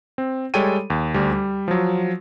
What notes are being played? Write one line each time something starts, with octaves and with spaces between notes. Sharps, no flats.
C4
G3 G#3 A4 C#5 G5 D#7
D#2
D2 G3
G3
F3 F#3